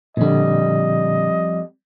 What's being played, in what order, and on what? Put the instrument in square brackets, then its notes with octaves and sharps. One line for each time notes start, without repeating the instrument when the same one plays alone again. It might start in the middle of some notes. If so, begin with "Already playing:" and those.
[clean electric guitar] F2 G3 [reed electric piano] A#2 D3 [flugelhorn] D#5